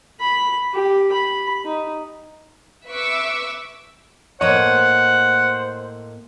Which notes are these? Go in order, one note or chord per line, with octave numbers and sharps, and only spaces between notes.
B5
G4
B5
D#4
B4 E5 C#6 D6 E6
A2 A#3 C5 C#5 D#5 F#5